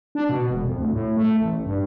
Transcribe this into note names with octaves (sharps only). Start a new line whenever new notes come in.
D4
B2
E1
F2
D2
A2
A3
A1
G2